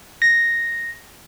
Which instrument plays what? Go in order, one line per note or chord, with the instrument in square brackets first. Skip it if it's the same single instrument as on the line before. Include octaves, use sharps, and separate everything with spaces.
[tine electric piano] A#6